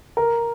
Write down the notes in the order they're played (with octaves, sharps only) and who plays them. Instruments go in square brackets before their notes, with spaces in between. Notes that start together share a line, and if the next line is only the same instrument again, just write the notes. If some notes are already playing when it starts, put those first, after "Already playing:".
[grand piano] A#4